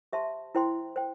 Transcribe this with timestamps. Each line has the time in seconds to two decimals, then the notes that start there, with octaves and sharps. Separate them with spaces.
0.13 G4 C5 E5 A5 C6
0.55 E4 C5 G5 C6
0.96 C5 G5